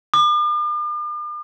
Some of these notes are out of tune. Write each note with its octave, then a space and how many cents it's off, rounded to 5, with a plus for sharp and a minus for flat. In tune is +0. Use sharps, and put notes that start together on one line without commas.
D6 +45